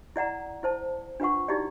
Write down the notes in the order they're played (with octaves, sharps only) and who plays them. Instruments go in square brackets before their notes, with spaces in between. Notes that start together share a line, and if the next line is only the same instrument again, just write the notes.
[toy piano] E4 D5 F#5 A#5
E4 C5 A5
D4 F4 B4 F#5 C#6
D#4 E4 F#4 G4 D5